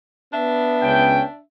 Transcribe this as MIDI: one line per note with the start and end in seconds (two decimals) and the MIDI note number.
0.34 1.27 59
0.34 1.38 62
0.34 1.38 76
0.82 1.22 37
0.82 1.22 61
0.82 1.22 79